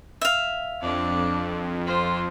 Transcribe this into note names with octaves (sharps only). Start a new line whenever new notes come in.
E5 F5
F2 D4 D5
F4 C5